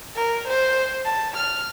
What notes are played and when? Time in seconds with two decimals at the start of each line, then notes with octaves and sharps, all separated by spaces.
0.16 A#4
0.48 C5
1.05 A5
1.37 F6